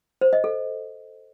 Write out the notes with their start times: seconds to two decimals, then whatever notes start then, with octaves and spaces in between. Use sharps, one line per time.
0.21 C5
0.33 D#5
0.44 A4